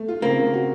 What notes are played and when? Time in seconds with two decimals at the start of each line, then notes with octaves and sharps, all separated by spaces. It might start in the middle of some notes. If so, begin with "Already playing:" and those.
Already playing: A3
0.08 F4
0.22 C#3 A#3 C4
0.39 C#3
0.54 F#4